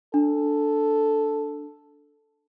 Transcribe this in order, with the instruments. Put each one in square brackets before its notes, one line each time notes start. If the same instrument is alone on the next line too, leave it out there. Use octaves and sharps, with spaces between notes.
[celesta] D4 [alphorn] A4